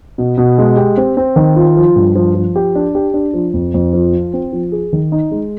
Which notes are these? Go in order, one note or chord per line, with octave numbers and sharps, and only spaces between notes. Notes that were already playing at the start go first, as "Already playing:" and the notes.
B2
B2
G#3
G4
C4
C4
D#3
F4
F3
G2
F3
F3
G4
D4
G4
D4
F3
F2
F2
F3
F4
C4
F3
G#4
D#3
D#4
G#3